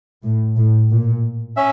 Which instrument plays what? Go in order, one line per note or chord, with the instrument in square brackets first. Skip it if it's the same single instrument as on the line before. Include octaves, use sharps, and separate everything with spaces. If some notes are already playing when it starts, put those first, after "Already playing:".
[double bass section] A2
A2
A#2
[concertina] C#4 E5